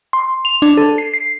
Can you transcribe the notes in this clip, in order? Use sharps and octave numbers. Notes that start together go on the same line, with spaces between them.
C6
F7
D4
A4
C7
C7